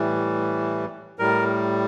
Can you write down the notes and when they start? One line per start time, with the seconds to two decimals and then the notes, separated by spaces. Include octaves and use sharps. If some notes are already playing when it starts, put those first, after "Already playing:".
Already playing: A2 E3 G3
1.19 A2 G3 A#4